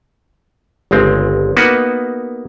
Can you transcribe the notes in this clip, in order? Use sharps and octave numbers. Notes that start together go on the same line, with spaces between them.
G1 C#2 G#3 C4
A#3 B3 D#4 F#4 B4